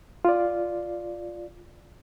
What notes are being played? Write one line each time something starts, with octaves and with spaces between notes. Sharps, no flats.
F4 D5